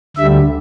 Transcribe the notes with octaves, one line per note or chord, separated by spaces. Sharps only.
D2 D3 G3 E5